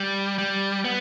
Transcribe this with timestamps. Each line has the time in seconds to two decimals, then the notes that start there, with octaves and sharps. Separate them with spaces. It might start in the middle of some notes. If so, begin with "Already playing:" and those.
Already playing: G3
0.38 G3
0.85 B3